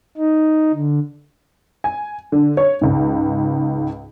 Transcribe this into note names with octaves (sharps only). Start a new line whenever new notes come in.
D#4
D3
G#5
D3
C#5
C#2 G#2